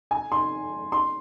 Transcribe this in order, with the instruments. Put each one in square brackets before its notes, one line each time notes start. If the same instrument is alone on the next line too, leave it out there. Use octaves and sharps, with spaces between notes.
[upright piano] G#5
C6
C6